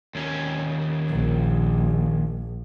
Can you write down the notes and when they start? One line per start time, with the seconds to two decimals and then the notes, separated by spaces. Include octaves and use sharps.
0.15 D#2 C#4
1.10 A#1